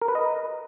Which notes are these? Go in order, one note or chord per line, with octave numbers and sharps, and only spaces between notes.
A#4
B4
D#5